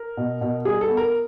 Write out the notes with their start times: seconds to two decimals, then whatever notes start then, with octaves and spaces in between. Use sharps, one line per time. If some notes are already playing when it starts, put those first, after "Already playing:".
Already playing: A#4
0.17 B2
0.41 B2
0.65 G3 G#4
0.81 A4
0.89 B3
0.97 A#4